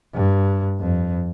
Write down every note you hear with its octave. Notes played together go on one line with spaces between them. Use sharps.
G2
F2